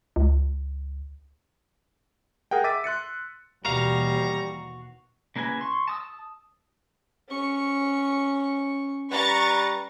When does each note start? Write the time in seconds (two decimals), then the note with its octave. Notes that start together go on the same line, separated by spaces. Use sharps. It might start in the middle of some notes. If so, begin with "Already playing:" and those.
0.16 C#2
2.51 G#4 A#4 F#5 G5
2.64 E5 D6 E6 A6 B6 D#7
2.84 C6 F#6 A6 C#7
3.65 D#2 B2 E3 G3 F#4 F5 A#5
5.36 C#3 A#3 E4 B4 G#5
5.61 C6 C#6
5.88 A5 D#6 E6
7.28 C#4 C#6
9.11 G3 B4 A#5 C#6 A6